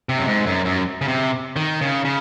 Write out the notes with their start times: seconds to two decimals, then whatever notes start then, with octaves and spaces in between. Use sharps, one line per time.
0.09 C3
0.19 F#2
0.28 G#2
0.46 F#2
0.65 F#2
1.01 C#3
1.08 C3
1.56 D#3
1.81 C#3
2.05 C#3